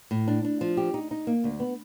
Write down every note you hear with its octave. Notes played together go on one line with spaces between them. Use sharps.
A2
D4
D4
F3
G4
D#4
D#4
A#3
D2
B3